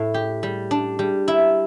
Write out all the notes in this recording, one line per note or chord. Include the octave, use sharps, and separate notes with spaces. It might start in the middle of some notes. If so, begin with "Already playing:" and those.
Already playing: A2 E4
G4
G3
D4
G3
E4